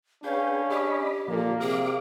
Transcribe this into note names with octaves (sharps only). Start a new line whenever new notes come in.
C#4 D4 G#4 B4 F5 G5
G4 D5 D#5 B5
A#2 F3 A#3 A4 A#4
C3 G#4 F5 D6